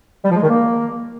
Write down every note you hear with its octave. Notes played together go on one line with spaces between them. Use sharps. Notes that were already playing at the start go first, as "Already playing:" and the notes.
G3
F3
G#3
D#3
A#3